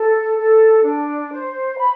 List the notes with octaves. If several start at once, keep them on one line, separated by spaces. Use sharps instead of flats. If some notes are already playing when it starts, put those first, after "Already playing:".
Already playing: A4
A4
D4
C5
B5